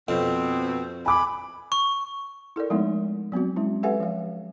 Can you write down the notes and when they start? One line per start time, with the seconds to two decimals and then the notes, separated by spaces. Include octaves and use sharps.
0.08 F2 B2 C4
1.06 G#5 B5 D6
1.72 C#6
2.56 E4 A4 A#4 D5
2.70 F3 G#3 A3 B3 D#4 E4
3.32 F#3 B3 C4 F#4
3.56 G#3 C#4 E4
3.83 G4 A4 B4 E5 F#5 G#5
4.00 F3 F5